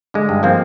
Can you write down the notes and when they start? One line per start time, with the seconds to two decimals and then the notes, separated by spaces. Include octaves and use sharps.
0.14 D3 G#3
0.29 G2
0.43 F3 A#3 C4